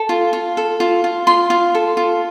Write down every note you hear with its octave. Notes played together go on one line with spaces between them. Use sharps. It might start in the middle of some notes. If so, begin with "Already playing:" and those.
Already playing: A4
F4
F4
A4
F4
F4
F4 C6
F4
A4
F4